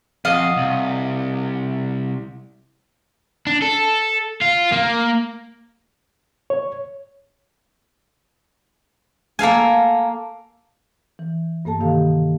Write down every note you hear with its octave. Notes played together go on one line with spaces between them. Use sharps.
F2 D#5 F5 F#5
C2
D4
A4
F4
A#3
C#5
A#3 A4 F5 G#5
E3
G2 A#3 A4 A5
C3 D#3 G4 F5